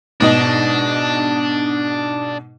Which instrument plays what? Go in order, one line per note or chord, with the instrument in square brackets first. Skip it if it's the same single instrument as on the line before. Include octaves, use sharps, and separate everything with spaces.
[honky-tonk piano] G#2 B2 D#5 [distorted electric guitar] D4